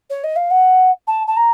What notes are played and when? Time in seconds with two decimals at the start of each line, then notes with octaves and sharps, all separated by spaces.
0.10 C#5
0.24 D#5
0.36 F5
0.50 F#5
1.07 A5
1.27 A5
1.36 A#5